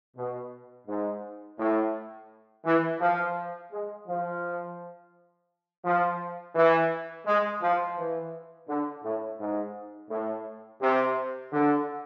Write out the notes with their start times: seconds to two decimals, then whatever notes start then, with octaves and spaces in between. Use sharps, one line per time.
0.17 B2
0.88 G#2
1.58 A2
2.65 E3
3.00 F3
3.71 G#3
4.08 F3
5.84 F3
6.55 E3
7.26 G#3
7.62 F3
7.97 E3
8.69 D3
9.04 A2
9.39 G#2
10.10 A2
10.81 C3
11.52 D3